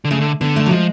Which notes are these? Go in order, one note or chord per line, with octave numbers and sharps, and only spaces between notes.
D3
C#3 A3
D3
D3 B3
A3
F#3
F3 G#3